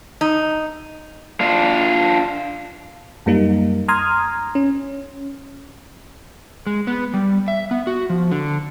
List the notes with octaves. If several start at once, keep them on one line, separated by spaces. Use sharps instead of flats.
D#4
D4 F4
F#2 G3 A#3 D#4
A#5 C6 D#6 F6 G#6
C#4
G#3
B3
G3
E5
B3
F#4
F3
D3